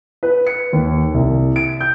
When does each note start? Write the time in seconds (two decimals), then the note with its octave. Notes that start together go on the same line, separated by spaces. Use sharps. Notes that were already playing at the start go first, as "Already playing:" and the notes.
0.23 B4
0.47 C#7
0.73 D#2
1.14 C2
1.56 D7
1.81 G6